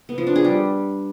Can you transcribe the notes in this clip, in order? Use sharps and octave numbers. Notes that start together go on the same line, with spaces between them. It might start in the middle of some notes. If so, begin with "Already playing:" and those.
B3
F3
D4
G#4
G3